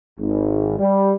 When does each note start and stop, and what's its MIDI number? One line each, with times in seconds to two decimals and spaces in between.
0.20 0.74 32
0.79 1.13 55